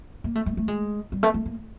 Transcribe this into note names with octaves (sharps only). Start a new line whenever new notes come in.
A#3
A3
A3
A3
G#3
G3
A3
A3
A#3